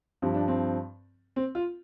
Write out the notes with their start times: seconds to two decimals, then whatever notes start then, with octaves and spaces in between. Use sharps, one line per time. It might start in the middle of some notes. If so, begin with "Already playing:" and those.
0.22 G2 F3 C4
0.34 D4
0.48 C4
1.36 C4
1.55 F4